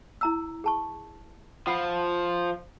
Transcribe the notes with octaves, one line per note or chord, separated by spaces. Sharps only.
E4 A#5 E6
G#4 A5 C#6
F3 F4 F#5 B5